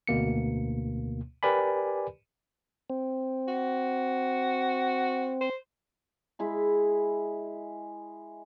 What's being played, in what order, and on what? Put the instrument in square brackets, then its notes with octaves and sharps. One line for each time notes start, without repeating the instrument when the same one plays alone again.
[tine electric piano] D2 B2 A#3 C#7
G4 A#4 B4 D5 G#5 B5
[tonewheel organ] C4
[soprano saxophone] F#4
C5
[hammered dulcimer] G#3 E4 B5